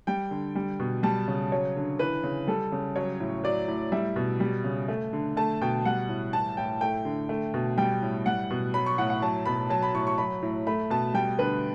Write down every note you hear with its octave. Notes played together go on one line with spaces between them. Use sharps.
G3 G5
D3
G3
B2
G3 A5
C#3
F#3 C#5
D3
E3 B4
C#3
G3 A4
C#3
F#3 C#5
A2
F#3 D5
A2
G3 E5
B2
G3
C#3
A3
D3
A3 A5
B2 G5
G3 F#5
A2
E3 A5
A2 G5
A3 G5
D3
A3
B2
G3 G5
A2
G3 F#5
B2
F#3 B5
C#6
A2 F#5
F#5
F#3 A5
B2 B5
F#3 A5
B5
A2 C#6
C#6
F#3 B5
A2
A3 B5
B2 A5
G3 G5
D3 B4